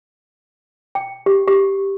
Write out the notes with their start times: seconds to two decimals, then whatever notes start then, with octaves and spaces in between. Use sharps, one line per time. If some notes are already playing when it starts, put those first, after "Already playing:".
0.95 G5
1.26 G4
1.48 G4